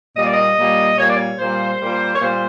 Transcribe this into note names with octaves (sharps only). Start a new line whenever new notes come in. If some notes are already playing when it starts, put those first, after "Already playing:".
A#2 G3 A#3 D#5
D5
D#5
A#2 G3 A#3
A#2 G3 A#3 C#5
D5
C#5
A#2 G3 A#3 C5
A#2 G3 A#3
C#5
A#2 G3 A#3 C5